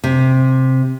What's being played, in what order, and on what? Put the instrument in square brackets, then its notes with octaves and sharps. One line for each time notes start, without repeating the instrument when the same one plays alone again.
[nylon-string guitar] C3